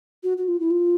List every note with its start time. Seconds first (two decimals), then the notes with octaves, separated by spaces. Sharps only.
0.23 F#4
0.37 F#4
0.48 F4
0.60 E4
0.70 F4